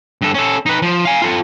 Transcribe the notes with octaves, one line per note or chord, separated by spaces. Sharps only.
G2 A4
C#4 A4
D#4 B4
F3
F5 G#5
F4 A4